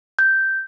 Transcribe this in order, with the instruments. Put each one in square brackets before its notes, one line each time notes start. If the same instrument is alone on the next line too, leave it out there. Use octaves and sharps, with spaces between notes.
[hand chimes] G6